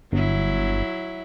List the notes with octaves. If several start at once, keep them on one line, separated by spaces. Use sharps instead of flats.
G1 F#3 E4